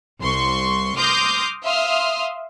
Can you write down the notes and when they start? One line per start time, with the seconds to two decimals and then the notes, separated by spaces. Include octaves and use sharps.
0.22 C2 C6 C#6
0.96 C6 D6 D#6 F6 G6 A#6
1.64 E5 F5 C6 D#6 F6